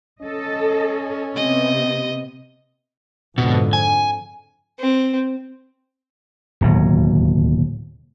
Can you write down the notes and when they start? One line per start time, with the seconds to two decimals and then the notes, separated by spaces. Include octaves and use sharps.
0.21 C#4 A4 D#5
1.36 C3 B3 D#5
3.38 F2 G#2 B2 D3
3.73 G#5
4.79 C4
6.61 D1 D#2 B2 F#3